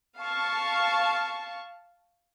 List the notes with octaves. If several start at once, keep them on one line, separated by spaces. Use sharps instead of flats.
F5 A5 C#6